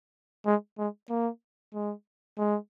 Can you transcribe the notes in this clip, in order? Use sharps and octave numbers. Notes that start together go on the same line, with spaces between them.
G#3
G#3
A#3
G#3
G#3